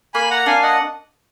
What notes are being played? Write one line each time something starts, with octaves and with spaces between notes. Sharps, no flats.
A#3 G#5 B5
F#5 A#5
D4 F5 G#5
D#5 F#5